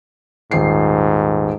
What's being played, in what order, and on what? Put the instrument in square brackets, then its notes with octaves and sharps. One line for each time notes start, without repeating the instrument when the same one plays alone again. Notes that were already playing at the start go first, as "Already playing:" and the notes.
[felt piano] D#1 C7 [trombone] G#2